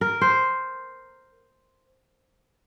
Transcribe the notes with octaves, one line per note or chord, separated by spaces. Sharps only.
A#4
C5